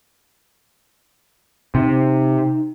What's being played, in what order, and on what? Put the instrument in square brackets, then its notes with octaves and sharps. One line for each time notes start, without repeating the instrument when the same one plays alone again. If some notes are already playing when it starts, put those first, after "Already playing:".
[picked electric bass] C3 [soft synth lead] D#4